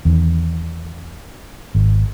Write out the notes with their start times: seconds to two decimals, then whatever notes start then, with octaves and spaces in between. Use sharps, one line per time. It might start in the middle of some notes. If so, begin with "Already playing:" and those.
0.05 E2 D#3
1.75 G#1